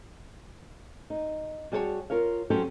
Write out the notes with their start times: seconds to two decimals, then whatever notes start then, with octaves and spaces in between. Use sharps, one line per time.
1.10 D#4
1.72 G3 F#4 G#4 A#4 C#5 A5
2.10 F4 A#4 C#5 F5
2.50 F#3 C4 C#4 F#4 G4 A4